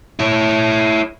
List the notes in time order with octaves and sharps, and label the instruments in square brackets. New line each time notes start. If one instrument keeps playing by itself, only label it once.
[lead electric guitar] E4 C#5